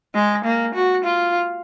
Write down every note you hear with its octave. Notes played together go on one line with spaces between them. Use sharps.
G#3
A#3
F#4
F4